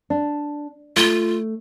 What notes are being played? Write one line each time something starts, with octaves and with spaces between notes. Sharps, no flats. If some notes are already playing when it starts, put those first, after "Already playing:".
D4
A3 F4